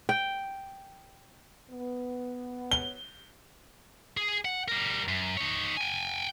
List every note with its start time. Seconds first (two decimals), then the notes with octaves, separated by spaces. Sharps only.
0.09 G5
1.71 B3
2.71 G7
4.17 G#4
4.45 F#5
4.68 G3 A#4
5.08 F#2
5.37 D#4 C#5
5.77 G5 G#5